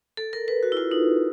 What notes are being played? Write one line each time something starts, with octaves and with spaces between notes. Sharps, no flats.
A4
A#4
B4
F#4
E4
F4
D#4